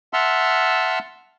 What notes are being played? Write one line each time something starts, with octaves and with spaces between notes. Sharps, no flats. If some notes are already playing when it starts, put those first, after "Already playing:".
E5 F#5 A5 C6 E6 F6